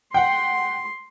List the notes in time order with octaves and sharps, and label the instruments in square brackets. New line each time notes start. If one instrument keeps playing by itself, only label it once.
[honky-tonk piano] F#5 G5 [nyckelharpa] C6